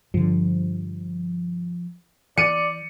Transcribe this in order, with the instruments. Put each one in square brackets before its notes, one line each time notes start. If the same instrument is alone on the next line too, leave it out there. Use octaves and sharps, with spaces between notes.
[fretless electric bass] G2 D3 [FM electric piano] F3
[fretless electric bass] E3 [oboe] D5 [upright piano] C#7 D#7